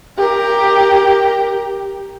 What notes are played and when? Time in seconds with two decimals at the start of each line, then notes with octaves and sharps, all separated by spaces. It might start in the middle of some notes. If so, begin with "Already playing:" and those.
0.18 G4 A#4